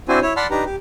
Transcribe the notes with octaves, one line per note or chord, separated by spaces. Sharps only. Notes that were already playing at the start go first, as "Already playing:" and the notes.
C4 D4 E4 F#4 C5 G#5
E4 C#5
D5 F#5 A5 B5 C6 F6
D4 D#4 G4 B4 A#5
G4